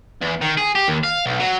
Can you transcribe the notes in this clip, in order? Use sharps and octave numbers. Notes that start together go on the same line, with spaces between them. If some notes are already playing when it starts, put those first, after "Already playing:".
E2
D#3
G#4
G4
D#2
F5
B1
F#3